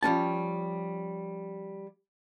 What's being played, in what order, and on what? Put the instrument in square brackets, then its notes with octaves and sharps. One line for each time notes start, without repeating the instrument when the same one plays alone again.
[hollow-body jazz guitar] F3 G3 C#4 A5